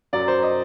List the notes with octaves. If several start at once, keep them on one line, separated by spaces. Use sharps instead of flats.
F#2 F#3 D5
C5
D#5